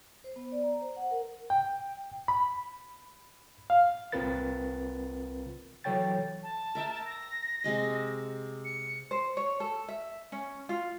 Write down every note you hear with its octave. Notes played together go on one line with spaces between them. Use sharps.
C5
B3
D5
A#5
C5
F#5
A#4
G5
B5
F5
C2 C4 F4 A#4 B4 A6
E3 F#3 A4 C#5 G5 A6
A5
A#4 E5 G5
A#6
C3 G#3 D#5
C#7
C5
C#5
A4
E5
C#4
F4